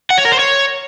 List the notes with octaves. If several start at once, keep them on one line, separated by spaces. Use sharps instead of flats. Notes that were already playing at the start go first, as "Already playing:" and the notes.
F#5
C#5
A#4
C5
C#5